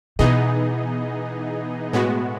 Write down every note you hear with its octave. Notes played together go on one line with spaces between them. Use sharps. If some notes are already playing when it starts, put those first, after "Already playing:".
B2 E3 B3 D#4 G#4 D#5
A2 G#3 B3 F#4